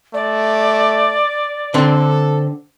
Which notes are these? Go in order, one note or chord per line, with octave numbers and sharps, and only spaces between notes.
A3 D5
D3 C4 A4